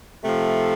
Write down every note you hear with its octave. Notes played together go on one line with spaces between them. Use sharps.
C3 F3 A3